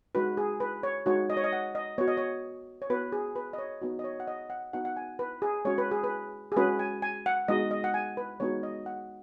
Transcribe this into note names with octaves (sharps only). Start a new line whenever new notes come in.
G#3 D#4 F#4 B4
G#4
B4
C#5
G#3 D#4 F#4 C#5
D#5
C#5
D#5
F#5
D#5
B3 F#4 C#5
D#5
C#5
C#5
B3 F#4 B4
G#4
B4
D#5
C#5
B3 D#4 F#4
D#5
C#5
F#5
D#5
F#5
B3 D#4 F#4 F#5
F#5
G#5
B4
G#4
G#3 C#4 F#4 C#5
B4
G#4
B4
G#4
G#3 C#4 F#4 B4
G#5
G#5
F#5
G#3 B3 D#4 F#4 D#5
D#5
F#5
G#5
B4
G#3 B3 D#4 F#4 C#5
D#5
F#5